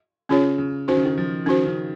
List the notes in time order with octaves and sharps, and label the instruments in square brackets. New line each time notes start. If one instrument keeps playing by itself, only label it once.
[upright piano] C#3 [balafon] C#4 F4 G#4 C#5
[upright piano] C#3
[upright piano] D#3 [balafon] C#4 F#4 C5
[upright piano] C#3
D#3
F3
[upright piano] D#3 [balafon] C#4 F#4 C5
[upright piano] C#3